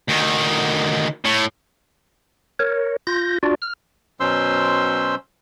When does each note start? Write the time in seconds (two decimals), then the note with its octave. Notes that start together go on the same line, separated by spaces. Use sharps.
0.08 D2 D#3
1.25 A2
2.59 A#4 C#5
3.07 F4 G6 A#6
3.43 D4 F4 F#4 D5
3.62 F6
4.20 B2 F#3 C#4 C5 C6 E6